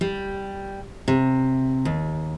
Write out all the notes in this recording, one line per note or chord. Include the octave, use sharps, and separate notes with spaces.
G3
C3
D#2